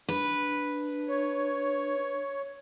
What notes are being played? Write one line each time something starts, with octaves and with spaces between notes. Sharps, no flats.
D4 B4
C#5